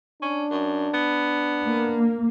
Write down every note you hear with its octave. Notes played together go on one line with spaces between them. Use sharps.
C#4 D4
F#2
B3
A#3